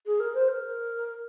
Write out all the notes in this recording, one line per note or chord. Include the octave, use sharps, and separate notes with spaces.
G#4
A#4
C5
A#4